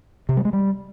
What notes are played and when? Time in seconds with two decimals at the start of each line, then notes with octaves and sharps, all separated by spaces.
0.29 C3
0.37 G3
0.45 G#3
0.53 G3